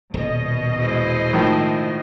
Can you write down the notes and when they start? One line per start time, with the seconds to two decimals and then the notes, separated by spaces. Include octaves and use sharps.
0.14 D#1 B2 D#5
0.78 G#3 E4 C5
1.33 A2 D#3 F3